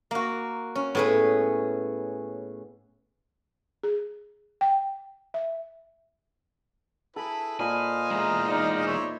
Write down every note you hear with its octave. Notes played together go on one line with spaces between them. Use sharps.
A#3 F#4
C#4
A2 B3 G#4 B4
G#4
G5
E5
E4 G#4 A4 B4
A#2 C5 D#5 F5 G#5 B5
E2 G#3 A#4
D#4 D5
C5 C#5 E5